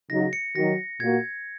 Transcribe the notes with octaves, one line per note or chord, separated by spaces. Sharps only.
C#3 F#3 D#4 F#4 A#6
C#7
D#3 F#3 D#4 F#4 A#6
A#2 A#3 F#4 G#6